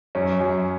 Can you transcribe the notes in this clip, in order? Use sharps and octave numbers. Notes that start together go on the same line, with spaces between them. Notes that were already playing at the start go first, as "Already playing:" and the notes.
F#2 C#4
F#2